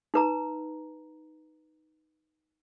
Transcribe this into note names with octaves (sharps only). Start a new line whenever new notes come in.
D#4 B4 A#5